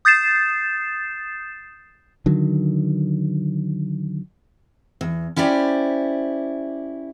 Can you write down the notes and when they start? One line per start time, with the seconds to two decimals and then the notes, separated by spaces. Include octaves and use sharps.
0.05 D#6 G6 A6 C7 E7
2.26 D3 D#3 F#3
5.01 E2
5.36 C#4 E4 G4 C5 D5